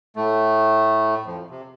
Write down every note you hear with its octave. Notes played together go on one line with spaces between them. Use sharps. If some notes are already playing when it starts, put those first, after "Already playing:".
A2 A3
F2 F3
C3